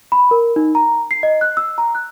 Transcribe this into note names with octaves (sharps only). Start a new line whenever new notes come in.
B5
A#4
D#4
A#5
C7
D#5
F#6
E6
A#5
F#6